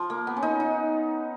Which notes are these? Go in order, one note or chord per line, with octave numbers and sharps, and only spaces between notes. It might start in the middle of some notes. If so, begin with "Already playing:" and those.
Already playing: F3
A#3
B3
C#4
D#4
D#4